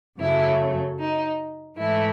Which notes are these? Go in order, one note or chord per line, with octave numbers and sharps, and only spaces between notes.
F#2 C#3 F#3 A3 E4
D#4
G#2 E3 A3 E4